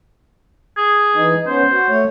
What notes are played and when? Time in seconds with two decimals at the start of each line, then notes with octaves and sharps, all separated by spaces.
0.77 G#4
1.15 E3 D#4
1.47 B3 C#4 C5
1.71 F#4
1.89 A3 C#5